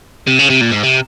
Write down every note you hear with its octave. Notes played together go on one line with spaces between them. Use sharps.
C3
C#3
C3
A#2
G#2
C3